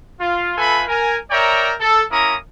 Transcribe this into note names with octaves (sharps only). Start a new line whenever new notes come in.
F4
A3 F4 A4 B4 G#5 B5
A#4 G#5
A#4 C#5 D5 E5 G5 A#5
A4
A#3 C#4 E4 A#4 A#5 D#6